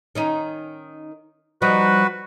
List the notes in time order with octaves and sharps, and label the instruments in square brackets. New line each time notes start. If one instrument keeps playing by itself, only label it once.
[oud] D#3 C#4 D#4
[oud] F3 G3 D#4 [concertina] F#4 B4